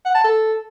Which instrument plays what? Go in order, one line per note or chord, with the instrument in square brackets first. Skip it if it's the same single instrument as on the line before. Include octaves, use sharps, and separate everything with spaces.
[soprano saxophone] F#5
A5
A4